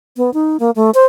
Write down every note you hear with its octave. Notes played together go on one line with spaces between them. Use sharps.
B3
D#4
A#3
A3
C5